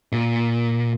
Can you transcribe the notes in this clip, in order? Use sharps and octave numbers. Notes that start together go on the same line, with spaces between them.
A#2